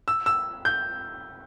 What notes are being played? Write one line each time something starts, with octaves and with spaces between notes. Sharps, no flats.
E6
E6
G6